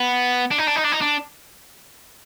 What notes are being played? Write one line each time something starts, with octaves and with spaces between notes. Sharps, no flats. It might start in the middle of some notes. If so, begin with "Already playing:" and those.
Already playing: B3
D4
D#4
D4
D#4
D4
D#4
D4